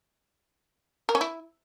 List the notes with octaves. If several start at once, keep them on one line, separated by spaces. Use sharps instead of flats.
A#4
C#4
E4